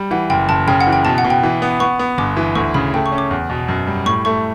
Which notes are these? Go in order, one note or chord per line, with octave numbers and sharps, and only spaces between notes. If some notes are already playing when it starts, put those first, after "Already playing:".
Already playing: G3
E3 F#5
F#1 G5
F#1 A5
C#3 G5
F#5
E3
G5
B2 A5
F#5
B2
G5
E3
B3
B3 C#6
B3
G1 D6
E3
D2 C#6
C#3 B5
A3 G5
C#6
C#4
D6
E2
B2
F#2
G3
A2 C#6
A3 C#6